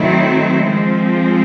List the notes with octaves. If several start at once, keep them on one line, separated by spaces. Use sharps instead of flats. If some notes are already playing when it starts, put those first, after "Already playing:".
Already playing: D#3 F#3 A3 C4 E4
F3 G#3 C4